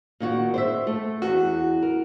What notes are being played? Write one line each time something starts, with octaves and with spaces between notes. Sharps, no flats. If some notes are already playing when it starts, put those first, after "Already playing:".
A#2 D#3 F#4
C5 D5 E5
A3
E2 F#4
A#4